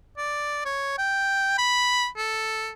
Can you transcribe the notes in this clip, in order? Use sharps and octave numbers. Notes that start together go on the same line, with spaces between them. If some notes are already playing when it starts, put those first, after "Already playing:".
D5
C#5
G5
B5
A4